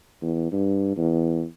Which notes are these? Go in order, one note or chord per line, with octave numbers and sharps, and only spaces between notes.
E2
G2
E2